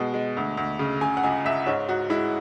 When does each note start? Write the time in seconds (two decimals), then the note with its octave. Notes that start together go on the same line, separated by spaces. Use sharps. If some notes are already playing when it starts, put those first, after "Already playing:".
Already playing: B2 G#3
0.14 G#3
0.37 D2
0.57 D2
0.79 C#3
1.01 C#3 G#5
1.17 F#5
1.24 C#2 G#5
1.45 C#2 E5
1.66 G#2 C#5
1.89 G#2 F#4
2.10 G#3 E4